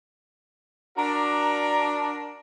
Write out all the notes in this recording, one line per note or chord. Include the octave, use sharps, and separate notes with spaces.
D4 F#4 A#4 A#5